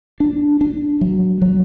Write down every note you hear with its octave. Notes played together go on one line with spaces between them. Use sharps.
D4
D4
F#3
F#3